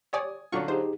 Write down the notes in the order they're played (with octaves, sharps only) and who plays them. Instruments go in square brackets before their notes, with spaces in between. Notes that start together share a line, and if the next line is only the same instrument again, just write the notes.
[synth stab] G4 C#5 D5 [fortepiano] G#5 D#6
[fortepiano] D3 F#3 F4 [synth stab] D4 C#6
[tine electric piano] D#4 G4 G#4 [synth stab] C5